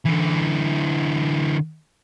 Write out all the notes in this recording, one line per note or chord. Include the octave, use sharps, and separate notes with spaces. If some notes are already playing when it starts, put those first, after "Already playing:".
D3 E3